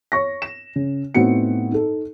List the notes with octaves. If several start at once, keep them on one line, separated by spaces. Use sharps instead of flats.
C#5 C#6 A#6
E7
C#3
A2 B3 C4 D#4 F#4 C#7
D#4 A4